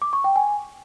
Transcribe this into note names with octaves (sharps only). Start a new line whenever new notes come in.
D6
C#6
G5
G#5